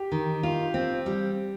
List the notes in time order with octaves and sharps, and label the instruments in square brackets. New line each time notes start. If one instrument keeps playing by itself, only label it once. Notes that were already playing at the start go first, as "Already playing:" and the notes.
Already playing: [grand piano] G4
[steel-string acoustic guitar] D#3
F4
C4
G3